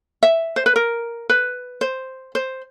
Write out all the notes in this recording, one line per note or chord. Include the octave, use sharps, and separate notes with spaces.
E5
C5
B4
A#4
B4
C5
C5